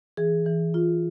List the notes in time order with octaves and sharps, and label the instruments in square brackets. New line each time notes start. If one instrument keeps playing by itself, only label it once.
[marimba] E3 G#4
E3
F4